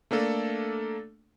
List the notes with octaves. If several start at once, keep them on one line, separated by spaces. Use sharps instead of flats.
A3 A#3 D4 A4